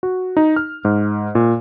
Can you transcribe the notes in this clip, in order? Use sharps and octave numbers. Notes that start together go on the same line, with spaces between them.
F#4
D#4
F6
G#2
A#2